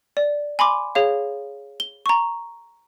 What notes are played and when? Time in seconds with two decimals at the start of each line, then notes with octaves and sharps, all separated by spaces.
0.17 D5
0.59 G#5 B5 C6 D6
0.95 G#4 C#5 F5
1.80 G7
2.06 A#5 C#6